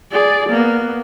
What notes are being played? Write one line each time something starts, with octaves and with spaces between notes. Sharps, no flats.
G#4 D5
A#3 B3